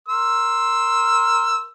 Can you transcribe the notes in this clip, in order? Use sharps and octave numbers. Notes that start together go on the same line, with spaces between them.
A#4 C6 E6